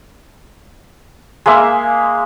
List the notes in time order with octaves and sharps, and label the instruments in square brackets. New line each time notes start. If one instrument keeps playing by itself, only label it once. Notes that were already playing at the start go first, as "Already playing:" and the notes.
[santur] G#3 A#3 E5